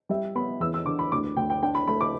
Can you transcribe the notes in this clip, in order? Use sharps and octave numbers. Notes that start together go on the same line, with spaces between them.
G3 E5
B3 B5
E2 E6
E6
D3 D6
B5
D2 D6
D2 G5
G5
D4 G5
B5
A3 B5
D6